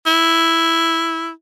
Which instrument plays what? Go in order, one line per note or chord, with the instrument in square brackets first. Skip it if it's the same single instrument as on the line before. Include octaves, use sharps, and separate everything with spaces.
[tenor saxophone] E4